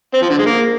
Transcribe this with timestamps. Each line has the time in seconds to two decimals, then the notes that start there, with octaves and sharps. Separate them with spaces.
0.14 C4
0.22 F3
0.30 D3
0.38 G#3
0.46 A#3